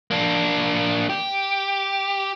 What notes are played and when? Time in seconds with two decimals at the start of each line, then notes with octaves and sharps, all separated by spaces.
0.11 A#3 D4
1.10 G4